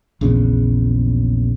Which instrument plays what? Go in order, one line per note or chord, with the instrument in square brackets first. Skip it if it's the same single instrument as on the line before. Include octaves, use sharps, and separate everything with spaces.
[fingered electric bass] A#1 E2 C#3